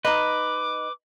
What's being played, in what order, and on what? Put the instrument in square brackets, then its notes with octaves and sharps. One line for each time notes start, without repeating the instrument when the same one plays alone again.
[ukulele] D#4 D#5 [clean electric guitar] B4 [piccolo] D6